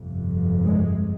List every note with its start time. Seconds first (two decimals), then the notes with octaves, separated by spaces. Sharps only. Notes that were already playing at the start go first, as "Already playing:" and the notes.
Already playing: G1 F2 C3
0.64 G#3